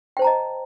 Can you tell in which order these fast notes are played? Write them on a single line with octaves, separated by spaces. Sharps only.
G5 C5 A5 A#5 D#5